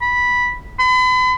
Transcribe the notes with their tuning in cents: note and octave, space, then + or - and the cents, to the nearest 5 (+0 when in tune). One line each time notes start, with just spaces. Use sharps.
B5 -10
B5 +40